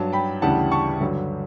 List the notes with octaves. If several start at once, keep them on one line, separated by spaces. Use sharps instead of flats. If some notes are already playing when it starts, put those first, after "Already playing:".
Already playing: G2 F#3 A5
G5 B5
D2 C#3 E3 G3 F#5 A5
A5 C#6
G2 D3 F#3